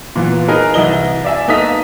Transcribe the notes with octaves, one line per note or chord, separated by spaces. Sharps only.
A#2 E3 B3
D#4 G#4 A#4 B4
C2 E3 E4 D#5 G7
D5 E5 G#5
A#3 B3 D#4 A4 D#6 B6